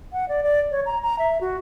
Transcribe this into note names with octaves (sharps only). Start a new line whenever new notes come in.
F#5
D5
D5
C#5
A#5
A#5
E5
F#4